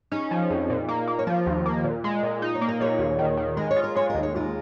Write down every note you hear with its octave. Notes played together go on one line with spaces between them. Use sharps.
C#4 D#4 G#4
F3
F2
A#2
A#3
A#3
C#5
F3 F4 A#4
D#2
A#3
A#2
G#3
A#2
D#4
C#5
A#3
A#4
A#2 G#4 C#5
D#2
D#3
D#3
G#3 A#4
C#5
F4
A#4
G#3 C#5
D#2 A#4
C#5
D#2 F4 A#4